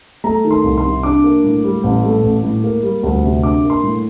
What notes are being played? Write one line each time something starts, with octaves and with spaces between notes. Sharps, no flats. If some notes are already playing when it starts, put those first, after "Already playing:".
A3 A#5
D#3
C6
C2
C6
C3
D4 D6
A#3
A2
G3
A1
A3
A1
A2
A#3
G3
D2
C3
D4 D6
A#3
C6
A2